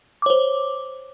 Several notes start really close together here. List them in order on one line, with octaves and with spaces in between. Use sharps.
D6 C#5 C5